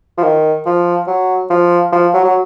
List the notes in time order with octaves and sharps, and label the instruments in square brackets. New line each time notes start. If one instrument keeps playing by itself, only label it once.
[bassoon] F3
D#3
F3
F#3
F3
F3
F#3
F#3